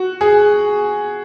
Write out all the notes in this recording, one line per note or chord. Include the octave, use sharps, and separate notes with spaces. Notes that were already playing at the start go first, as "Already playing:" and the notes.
Already playing: F#4
G#4